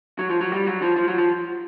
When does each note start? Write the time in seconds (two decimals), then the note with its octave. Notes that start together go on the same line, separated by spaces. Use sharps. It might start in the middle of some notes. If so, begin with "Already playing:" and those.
0.19 F#3
0.30 F3
0.41 F#3
0.52 G3
0.67 F#3
0.82 F3
0.96 F3
1.08 F#3
1.18 F3